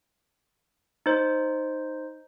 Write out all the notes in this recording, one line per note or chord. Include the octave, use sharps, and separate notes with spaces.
D#4 C5